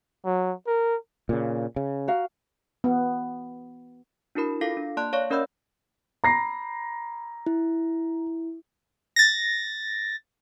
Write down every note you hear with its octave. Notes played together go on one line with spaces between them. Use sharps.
F#3
A#4
A#2 C#3
C#3
F#4 A#4 F5
B3
D4 E4 F#4 A#4 B5
F4 A4 F5 A#6 C7
D4
A#3 D5 A5 C6 F#6
C#5 D5 F5 C#6
C#4 A#4 D#5 B5 E6 G6
A#5 B5 A#6 C7
E4
A6 A#6